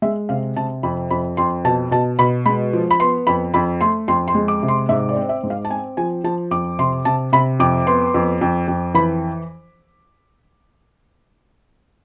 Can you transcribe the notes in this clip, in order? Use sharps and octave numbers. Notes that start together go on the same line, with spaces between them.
G#3 E5
C3 F5
C3 A5
F2 B5
F2 B5
F2 C6
B2 A5
B2 A5
B2 B5
G#3 B5
F3
B5
B3 C6
F2 B5
F2 B5
A3 C6
F2 C6
C6
G#3
D6
C3
C6
G#2 E5
D5
C4
E5
G#2
F5
A5
C4 G#5
F3 G#5
F3 A5
F2 D6
C3 C6
C3 A5
C3 B5
F2 D6
B3 C6
F2
F2
F2
E3 B5